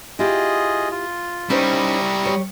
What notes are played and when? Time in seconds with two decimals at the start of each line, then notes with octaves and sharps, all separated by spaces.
0.19 E4 F4 G4 G#4 D#5
0.91 F4
1.50 G3 C#4 D#4 E4 C5 A#5 C#6 D#6
2.26 G4 C#5